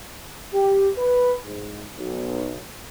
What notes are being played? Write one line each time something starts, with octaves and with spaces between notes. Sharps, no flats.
G4
B4
G#2
B1